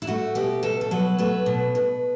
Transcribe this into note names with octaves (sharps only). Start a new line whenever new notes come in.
E4
A3 F#4
B2 G4
B2 A4
A4
F#3 B4
A3 B4
B2
B2